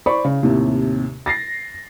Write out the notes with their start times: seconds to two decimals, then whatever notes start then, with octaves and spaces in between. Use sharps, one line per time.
0.06 C5 D5 B5 C#6
0.25 C#3
0.43 D#2 A2 C3
1.26 A6 A#6 C7